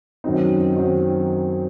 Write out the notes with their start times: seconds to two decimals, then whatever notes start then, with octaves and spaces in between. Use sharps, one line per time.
0.24 F#2 D#3 F#3 C4 D#4
0.76 D#3 F#3 C4